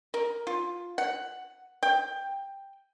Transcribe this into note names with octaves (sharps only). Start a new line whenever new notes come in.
A#4
F4
F#5
G5